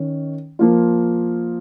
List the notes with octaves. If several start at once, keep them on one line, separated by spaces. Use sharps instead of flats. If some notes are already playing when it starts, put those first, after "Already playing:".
Already playing: D#3 C#4
F3 A#3 F4